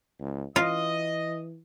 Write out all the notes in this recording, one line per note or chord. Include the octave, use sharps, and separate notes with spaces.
C#2
E3 F4 D#5